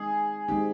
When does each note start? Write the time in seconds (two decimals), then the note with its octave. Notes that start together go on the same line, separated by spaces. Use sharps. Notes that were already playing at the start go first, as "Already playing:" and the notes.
Already playing: G#3 C4 D#4 G#4
0.48 G#3 C4 D#4 G4